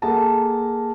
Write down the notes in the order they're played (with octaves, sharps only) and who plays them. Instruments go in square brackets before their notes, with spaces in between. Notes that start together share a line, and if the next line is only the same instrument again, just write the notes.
[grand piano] A#3 G#4 A4 F#5 A5 A#5